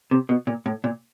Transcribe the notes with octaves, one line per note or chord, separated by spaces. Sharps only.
C3
B2
A#2
A2
A#2